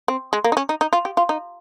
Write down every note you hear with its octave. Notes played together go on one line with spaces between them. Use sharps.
C4
G#3
A#3
D#4
C#4
D#4
D#4
F4
G4
F4
D#4